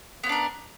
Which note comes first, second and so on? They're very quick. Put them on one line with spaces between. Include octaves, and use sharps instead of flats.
B3 E4 D4 A#4